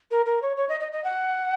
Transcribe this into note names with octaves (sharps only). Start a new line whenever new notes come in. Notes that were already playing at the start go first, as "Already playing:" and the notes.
A#4
A#4
C#5
C#5
D#5
D#5
D#5
F#5